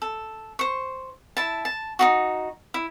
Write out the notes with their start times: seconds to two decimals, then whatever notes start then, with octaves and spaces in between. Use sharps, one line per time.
0.02 A4
0.59 C5 C#6
1.37 E4 A5
1.65 A5
1.99 D#4 F4 F#4
2.74 E4